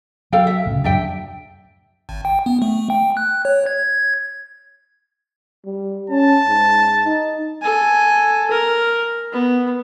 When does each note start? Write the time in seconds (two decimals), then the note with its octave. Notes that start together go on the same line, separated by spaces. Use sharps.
0.32 F#3 A4 F5 G5
0.47 E5
0.65 C2 A2 C#3
0.84 D1 F#2 F#3 D4 E5 G5
2.09 G#1
2.25 G5
2.46 B3
2.62 A3
2.90 G5
3.17 F#6
3.45 C#5
3.66 G#6
5.65 G3
6.10 C#4 A5
6.47 G#2
7.05 D#4
7.62 A4 G#5
8.51 A#4
9.32 B3